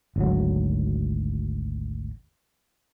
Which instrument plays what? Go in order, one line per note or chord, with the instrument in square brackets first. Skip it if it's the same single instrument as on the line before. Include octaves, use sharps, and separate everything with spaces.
[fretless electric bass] G#1 D2 F#3